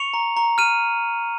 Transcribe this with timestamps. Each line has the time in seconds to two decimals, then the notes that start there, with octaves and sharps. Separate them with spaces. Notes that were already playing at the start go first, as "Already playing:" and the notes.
Already playing: C#6 C#7 F7
0.14 A#5
0.37 A#5
0.58 F6 D#7